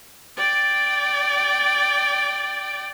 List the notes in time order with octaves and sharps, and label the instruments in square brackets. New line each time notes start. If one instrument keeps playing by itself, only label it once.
[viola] D5 G5